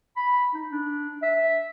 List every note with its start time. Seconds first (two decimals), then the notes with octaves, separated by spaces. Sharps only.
0.16 B5
0.54 D#4
0.71 D4
1.22 E5